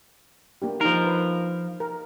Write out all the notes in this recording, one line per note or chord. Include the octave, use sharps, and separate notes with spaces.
A#3 D4 G4
F3 D#4 A#4
B4
A#4